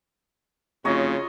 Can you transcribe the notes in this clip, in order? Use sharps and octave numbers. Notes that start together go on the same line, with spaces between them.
F1 C#3 F4 F#4 C#5 D#5 A#5